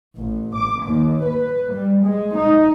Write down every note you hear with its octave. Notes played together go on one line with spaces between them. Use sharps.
A1
D6
D#2
B4
G3
G#3
D#4